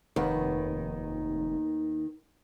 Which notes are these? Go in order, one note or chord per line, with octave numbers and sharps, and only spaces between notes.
F1 D#2 D#3 B3